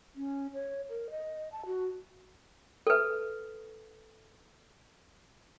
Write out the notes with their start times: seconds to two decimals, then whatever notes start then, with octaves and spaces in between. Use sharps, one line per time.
0.16 C#4
0.54 C#5
0.89 A#4
1.10 D#5
1.52 A5
1.66 F#4
2.87 A4 B4